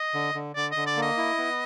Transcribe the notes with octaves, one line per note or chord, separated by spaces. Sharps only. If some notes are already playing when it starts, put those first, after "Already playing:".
Already playing: D#5
D3
D3
D3 D5
D3 D#5
D5
A#3
D#5
E4
B3